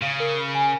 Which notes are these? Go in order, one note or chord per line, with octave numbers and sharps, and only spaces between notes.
C#3 F5
A#4
B5
G#5